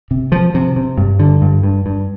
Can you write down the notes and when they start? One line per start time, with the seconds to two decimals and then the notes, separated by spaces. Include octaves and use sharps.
0.11 C3
0.32 F3
0.54 C3
0.76 C3
0.98 G2
1.19 D3
1.42 G2
1.63 G2
1.86 G2